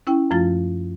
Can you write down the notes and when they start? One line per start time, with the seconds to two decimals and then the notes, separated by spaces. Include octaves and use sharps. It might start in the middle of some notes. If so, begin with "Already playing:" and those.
0.07 C#4 E4 G5
0.31 F#2 F3 A3 F4 A6